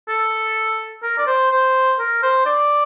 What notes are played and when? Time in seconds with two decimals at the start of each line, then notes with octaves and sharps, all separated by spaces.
0.08 A4
1.03 A#4
1.18 D5
1.27 C5
1.51 C5
1.99 A#4
2.22 C5
2.46 D5